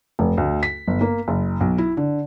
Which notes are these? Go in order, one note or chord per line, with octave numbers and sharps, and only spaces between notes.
F1
D2
B6
G1
A#3
F#1
B1
E4
D3